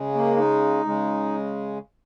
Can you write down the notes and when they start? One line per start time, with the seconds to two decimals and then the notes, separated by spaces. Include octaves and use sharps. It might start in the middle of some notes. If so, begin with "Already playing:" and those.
Already playing: C#3 G#3
0.14 A#3
0.37 D#4
0.85 C#3 G#3